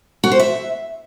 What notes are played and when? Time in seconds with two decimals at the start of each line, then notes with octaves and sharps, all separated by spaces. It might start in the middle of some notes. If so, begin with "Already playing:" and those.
0.24 F#4
0.31 C5
0.39 E5